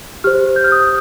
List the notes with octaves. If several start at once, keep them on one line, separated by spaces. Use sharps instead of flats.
G4 C5 F6
G6
F6
D#6